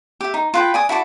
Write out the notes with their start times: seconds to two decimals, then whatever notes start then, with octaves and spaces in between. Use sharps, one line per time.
0.21 G4 E5
0.34 D#4
0.54 F4 B4 G5
0.74 D5 G#5 D#6
0.89 E4 F#4 A4 D5